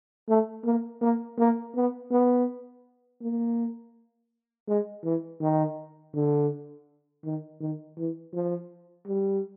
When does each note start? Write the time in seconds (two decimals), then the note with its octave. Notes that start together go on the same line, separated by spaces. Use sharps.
0.29 A3
0.65 A#3
1.02 A#3
1.39 A#3
1.76 B3
2.11 B3
3.22 A#3
4.68 G#3
5.04 E3
5.41 D#3
6.15 D3
7.25 D#3
7.61 D#3
7.98 E3
8.33 F3
9.07 G3